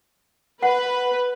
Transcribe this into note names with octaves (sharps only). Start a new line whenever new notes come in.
B4 F#5